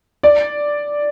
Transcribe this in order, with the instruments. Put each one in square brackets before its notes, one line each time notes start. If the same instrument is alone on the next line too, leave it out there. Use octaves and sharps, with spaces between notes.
[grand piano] D5